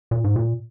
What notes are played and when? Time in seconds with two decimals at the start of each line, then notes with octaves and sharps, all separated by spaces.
0.11 A#2
0.24 G#2
0.36 A#2